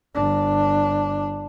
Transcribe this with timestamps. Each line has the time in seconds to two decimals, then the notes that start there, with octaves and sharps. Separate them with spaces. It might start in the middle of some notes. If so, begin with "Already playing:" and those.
0.14 G1 D4